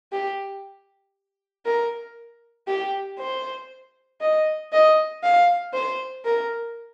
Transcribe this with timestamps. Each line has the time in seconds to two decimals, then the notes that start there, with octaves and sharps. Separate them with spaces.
0.12 G4
1.66 A#4
2.68 G4
3.19 C5
4.21 D#5
4.73 D#5
5.23 F5
5.74 C5
6.25 A#4